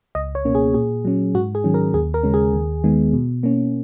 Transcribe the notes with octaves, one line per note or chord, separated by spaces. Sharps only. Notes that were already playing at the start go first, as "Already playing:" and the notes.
C#2 D#5
C#5
B2 A#3 C#4
G#4
A#2 G#4
F#3 C#4
G#2 F#4
G#4
D#3 F#3 C#4
A#4
D#2 G#4
A#4
C#3 G#3 C#4
G#4
D#2
D#3 G#3 B3
B2
A#3 C#4